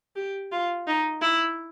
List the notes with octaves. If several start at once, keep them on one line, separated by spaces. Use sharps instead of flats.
G4
F4
D#4
E4